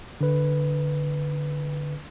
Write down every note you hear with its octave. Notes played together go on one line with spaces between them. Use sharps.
D3 B4